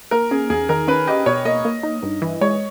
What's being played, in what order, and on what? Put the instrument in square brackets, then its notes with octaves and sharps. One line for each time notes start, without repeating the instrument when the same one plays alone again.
[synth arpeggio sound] A#3 [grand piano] A#4
[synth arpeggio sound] C#4 [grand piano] G#4
[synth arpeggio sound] E2 [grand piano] G#4
[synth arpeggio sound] D#3 [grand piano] A#4
[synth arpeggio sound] C#4 [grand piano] B4
[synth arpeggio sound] G4 [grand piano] D#5
[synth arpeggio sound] B2 [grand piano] C#5
[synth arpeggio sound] A#3 [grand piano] D#5
[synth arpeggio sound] A#3
D#4
G2
E3
[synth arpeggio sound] G#3 [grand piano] C#5